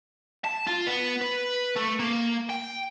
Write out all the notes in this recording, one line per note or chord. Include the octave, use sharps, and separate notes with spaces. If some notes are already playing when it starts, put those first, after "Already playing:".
A5
F4
B3
B4
A3
A#3
G5